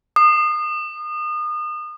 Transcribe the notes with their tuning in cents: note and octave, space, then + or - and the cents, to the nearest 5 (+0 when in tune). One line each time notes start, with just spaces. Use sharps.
D#6 -35